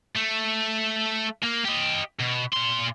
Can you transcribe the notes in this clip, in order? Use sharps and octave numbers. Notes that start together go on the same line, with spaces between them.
A3
A#3
G4 D#5
B2
A#2 C6